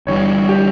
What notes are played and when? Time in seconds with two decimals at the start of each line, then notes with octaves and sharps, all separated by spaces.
0.07 G1 G2 E3 G3 C#5
0.49 G4